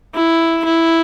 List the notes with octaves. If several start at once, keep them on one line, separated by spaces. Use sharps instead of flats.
E4
E4